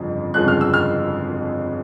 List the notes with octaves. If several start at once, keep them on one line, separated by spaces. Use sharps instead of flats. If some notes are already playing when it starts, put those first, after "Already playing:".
Already playing: G1 F2 C#3 F3 G#3
G1 F2 C#3 F3 G#3 F#6
F6
E6
F6